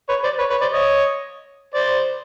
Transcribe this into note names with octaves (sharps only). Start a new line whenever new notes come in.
B4 C#5
C5 D5
B4 C#5
B4 C#5
C5 D5
C#5 D#5
C5 D5